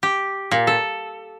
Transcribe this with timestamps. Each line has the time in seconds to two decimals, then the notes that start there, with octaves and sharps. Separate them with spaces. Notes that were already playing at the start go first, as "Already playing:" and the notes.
0.03 G4
0.51 A#2
0.67 A4